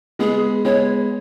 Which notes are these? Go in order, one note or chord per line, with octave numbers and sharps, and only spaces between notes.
G#3 B3 G#4
G#3 B3 C#5